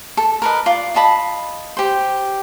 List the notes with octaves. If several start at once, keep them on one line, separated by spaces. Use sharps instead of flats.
A4
A#4 B4 D#5
F4 D5
F4 D#5 A5 B5
G4 C5